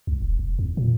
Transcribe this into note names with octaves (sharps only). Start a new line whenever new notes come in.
C2
E1
F1
E2
A#2